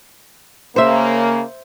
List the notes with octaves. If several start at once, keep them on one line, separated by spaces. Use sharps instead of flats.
C#3 A#3 C5 E5